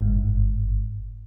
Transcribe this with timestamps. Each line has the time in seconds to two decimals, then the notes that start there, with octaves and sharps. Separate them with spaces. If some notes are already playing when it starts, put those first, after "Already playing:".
0.01 G1 G#2